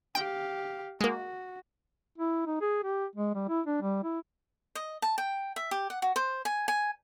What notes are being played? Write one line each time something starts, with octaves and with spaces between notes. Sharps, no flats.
G4 F5 G5
G#3 A#3 F#4
E4
D#4
G#4
G4
G#3
G3
E4
D4
G3
E4
D#5
A5
G5
E5
G4
F#5
F#4
C5
G#5
G#5